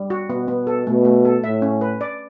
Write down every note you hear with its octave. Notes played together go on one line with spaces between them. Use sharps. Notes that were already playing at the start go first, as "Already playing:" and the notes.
Already playing: G3
F#4
B2 B3
B3
A4
B2 A3
A3
A4
A2 E5
C#4
B4
D5